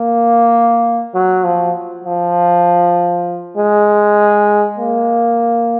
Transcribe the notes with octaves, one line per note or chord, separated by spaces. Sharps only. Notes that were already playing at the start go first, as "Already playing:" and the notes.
Already playing: A#3
F#3
F3
F3
G#3
A#3